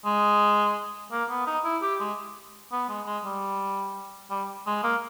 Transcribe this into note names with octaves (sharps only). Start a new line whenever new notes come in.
G#3
A#3
B3
D#4
E4
G4
G#3
B3
G#3
G#3
G3
G3
G#3
A#3